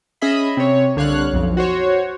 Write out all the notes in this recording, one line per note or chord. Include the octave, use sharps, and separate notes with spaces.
C#4 G#4 D#5 E5 B5
C3 C#5
C2 D3 C#5 F5 F#6
B1 F2
F#4 C5 C#5